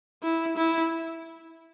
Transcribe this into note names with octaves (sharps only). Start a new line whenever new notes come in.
E4
E4